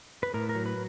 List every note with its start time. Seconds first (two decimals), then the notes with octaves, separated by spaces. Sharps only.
0.23 B4
0.34 A2 A#4
0.49 A#4
0.55 F#3
0.66 B4